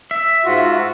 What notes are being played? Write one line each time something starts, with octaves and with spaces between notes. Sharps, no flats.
E5
G#2 F4 F#4